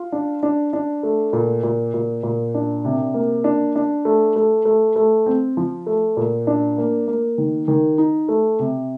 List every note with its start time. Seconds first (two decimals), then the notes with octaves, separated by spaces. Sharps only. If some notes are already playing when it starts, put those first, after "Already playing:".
Already playing: F4
0.12 D4
0.43 D4
0.73 D4
1.03 A3
1.33 A#2
1.63 A#2
1.94 A#2
2.23 A#2
2.54 D4
2.85 C3
3.14 A#3
3.44 D4
3.76 D4
4.05 A3
4.36 A3
4.65 A3
4.96 A3
5.26 C4
5.57 F3
5.87 A3
6.17 A#2
6.47 D4
6.78 A#3
7.08 A#3
7.38 D#3
7.68 D#3
7.98 D#4
8.29 A3
8.59 C3